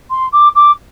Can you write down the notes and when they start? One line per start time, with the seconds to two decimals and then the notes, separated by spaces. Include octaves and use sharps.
0.10 C6
0.32 D6
0.55 D6